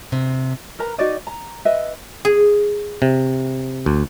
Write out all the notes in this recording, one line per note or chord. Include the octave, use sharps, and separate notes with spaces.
C3
A#4 B4 A#5
D#4 F#4 D5 D#5
A#5
B4 D#5 E5
G#4
C3
D2